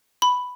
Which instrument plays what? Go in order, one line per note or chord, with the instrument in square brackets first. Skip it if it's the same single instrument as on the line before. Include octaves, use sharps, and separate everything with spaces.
[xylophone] B5